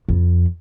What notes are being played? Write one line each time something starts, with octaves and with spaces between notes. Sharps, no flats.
F2